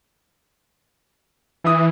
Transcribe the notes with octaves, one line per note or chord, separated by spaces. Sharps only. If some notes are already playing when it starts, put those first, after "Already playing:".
E3 E4 D#6